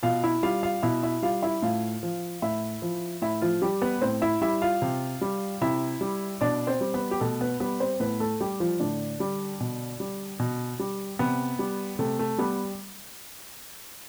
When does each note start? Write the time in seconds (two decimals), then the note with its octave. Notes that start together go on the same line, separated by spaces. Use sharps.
0.03 B2 F4 F5
0.24 E4 E5
0.43 G3 F4 F5
0.63 F4 F5
0.83 B2 E4 E5
1.03 E4 E5
1.22 G3 F4 F5
1.43 E4 E5
1.62 A2 F4 F5
2.03 F3
2.42 A2 E4 E5
2.82 F3
3.22 A2 E4 E5
3.42 F3 F4
3.62 G3 G4
3.82 B3 B4
4.01 A2 C4 C5
4.22 E4 E5
4.41 G3 E4 E5
4.62 F4 F5
4.82 C3
5.21 G3
5.61 C3 E4 E5
6.01 G3
6.41 B2 D4 D5
6.67 C4 C5
6.81 G3
6.94 B3 B4
7.11 G4
7.20 B2 A3 A4
7.41 B3 B4
7.60 G3 B3 B4
7.80 C4 C5
8.00 A2 B3 B4
8.20 A3 A4
8.40 G3 G4
8.60 F3 F4
8.80 A2 D3 D4
9.20 G3
9.60 B2
10.00 G3
10.40 B2
10.79 G3
11.19 C3 B3
11.59 G3
11.99 C3 A3
12.19 A3
12.38 G3 B3